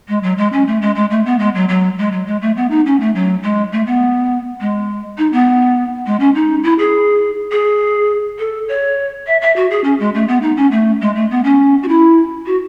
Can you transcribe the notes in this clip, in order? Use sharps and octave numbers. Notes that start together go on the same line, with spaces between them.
G#3
F#3
G#3
C#4
A3
G#3
G#3
A3
B3
G#3
F#3
F#3
G#3
F#3
G#3
A3
B3
D#4
C#4
A3
F#3
G#3
A3
B3
G#3
D#4
B3
G#3
C#4
D#4
E4
G#4
G#4
A4
C#5
E5
E5
F#4
G#4
C#4
G#3
A3
B3
D#4
C#4
A3
G#3
A3
B3
C#4
F#4
E4
F#4